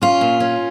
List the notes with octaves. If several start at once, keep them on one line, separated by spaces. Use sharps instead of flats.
C#4 F4
A#2
C#4